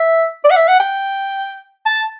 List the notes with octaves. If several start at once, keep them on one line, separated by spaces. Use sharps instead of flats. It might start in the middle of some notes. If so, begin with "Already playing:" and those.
Already playing: E5
D5
F#5
E5
F#5
G5
A5